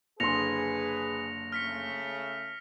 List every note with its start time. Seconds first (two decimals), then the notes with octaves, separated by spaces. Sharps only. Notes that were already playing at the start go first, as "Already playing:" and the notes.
0.20 F#1 D3 G#4 B4 C6 A#6 C#7 F7
1.52 C#3 A3 F6 B6 C#7